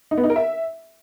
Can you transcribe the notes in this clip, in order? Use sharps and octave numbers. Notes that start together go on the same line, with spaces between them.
D#4
B3
D#4
A#4
E5